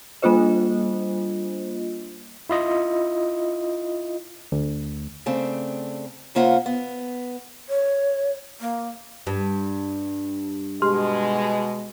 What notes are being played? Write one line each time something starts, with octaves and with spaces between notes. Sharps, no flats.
G3 A#3 D4 F4 C5 D#5
E4 F4 D#5
D2
C#3 A3 C4 D4
C#3 A#3 F4 C5 E5 F#5
B3
C#5
A#3
G2
B2 G#3 G4 C6 F6